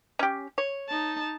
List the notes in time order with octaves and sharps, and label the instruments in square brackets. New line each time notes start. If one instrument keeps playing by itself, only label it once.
[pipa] C#4 G4
C#5
[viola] D#4 A5